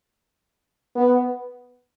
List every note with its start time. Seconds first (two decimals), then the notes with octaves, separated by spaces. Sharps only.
0.95 B3